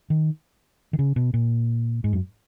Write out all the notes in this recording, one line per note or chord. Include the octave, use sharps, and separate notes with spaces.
D#3
D#3
C#3
B2
A#2
G#2
F#2